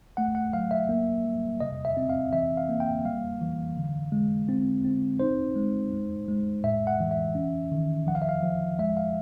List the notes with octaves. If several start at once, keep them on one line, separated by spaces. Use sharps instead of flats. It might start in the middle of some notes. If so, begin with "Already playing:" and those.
A3 F#5
F#5
F#3 F5
E5
A#3
G3
C3 D#5
E5
C4
F5
E3 E5
F5
A#3
G5
G3 F5
E3
D3
G#3
C4
C4
D#4 C5
G#3
G#3
G#3
A2 E5
F#5
E3
E5
C#4
D#3
F3 F#5
F5
E5
F5
F3
G#3 E5
F5